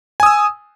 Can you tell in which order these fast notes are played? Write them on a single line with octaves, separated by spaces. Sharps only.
G#5 D#6 E6